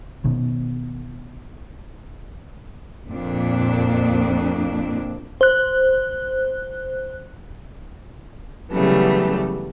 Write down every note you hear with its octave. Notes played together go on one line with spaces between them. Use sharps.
B2 D#3
F2 A#2 D4
C5 F#6
C#3 E3 F#3 G3 A3 B3